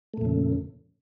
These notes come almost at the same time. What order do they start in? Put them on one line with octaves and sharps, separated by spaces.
A3 A#2 F2 C#3